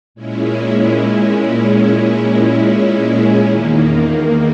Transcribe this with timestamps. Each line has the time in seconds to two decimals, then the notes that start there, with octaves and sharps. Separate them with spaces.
0.15 A#2 G#3 C#4 E4
3.39 E2 D#3 A#3